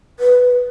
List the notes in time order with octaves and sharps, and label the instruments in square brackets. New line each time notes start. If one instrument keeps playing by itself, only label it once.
[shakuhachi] B4